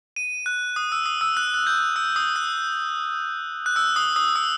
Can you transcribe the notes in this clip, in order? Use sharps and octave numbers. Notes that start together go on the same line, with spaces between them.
D#7
F#6
D#6
E6
D#6
E6
F#6
F#6
G6
E6
D#6
F#6
F#6
E6
D#6
D#6
E6